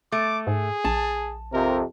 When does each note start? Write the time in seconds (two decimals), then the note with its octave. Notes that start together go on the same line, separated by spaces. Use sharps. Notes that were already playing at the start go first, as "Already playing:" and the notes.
0.12 A3 D6
0.47 G#2 G#4
0.84 A#1 A5
1.53 F2 C3 A#4